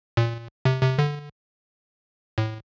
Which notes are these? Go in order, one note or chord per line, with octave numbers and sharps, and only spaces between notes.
A#2
C3
C3
D3
A2